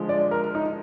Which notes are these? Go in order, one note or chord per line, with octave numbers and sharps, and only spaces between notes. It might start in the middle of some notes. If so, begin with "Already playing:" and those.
Already playing: D3 F3 G#3
D5
A#4
D#4